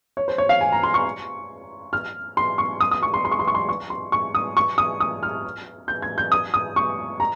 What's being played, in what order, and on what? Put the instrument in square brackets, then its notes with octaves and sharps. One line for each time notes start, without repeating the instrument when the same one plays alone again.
[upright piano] C#5
C5
C#5
F5
G#5
A#5
C6
C#6
F6
C6
C#6
D#6
D#6
C#6
C6
C6
C#6
C6
C#6
C6
C#6
C6
C#6
D#6
C#6
D#6
D#6
F6
G6
G#6
G6
D#6
D#6
C#6
A#5